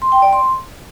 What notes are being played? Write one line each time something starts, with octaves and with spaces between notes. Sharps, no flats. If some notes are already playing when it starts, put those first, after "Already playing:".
C6
G5
D5
C6